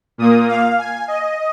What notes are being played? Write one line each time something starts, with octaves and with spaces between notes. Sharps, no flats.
A#2 A#3 D#6
F5
G#5
D#5